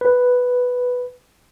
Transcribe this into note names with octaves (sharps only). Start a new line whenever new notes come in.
B4